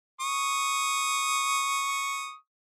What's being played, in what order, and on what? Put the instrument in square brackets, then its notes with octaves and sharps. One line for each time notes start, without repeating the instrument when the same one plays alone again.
[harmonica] C#6 D#6